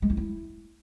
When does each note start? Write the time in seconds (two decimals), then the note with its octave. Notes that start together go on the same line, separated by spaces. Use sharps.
0.02 G#3
0.10 D#4
0.17 E4